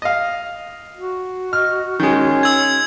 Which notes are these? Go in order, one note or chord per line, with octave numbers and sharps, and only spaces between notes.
D#5 F5
F#4
D#5 F6
D#3 G#3 C#4
E6 G#6